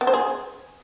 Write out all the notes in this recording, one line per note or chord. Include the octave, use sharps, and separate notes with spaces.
B3
C5
G#4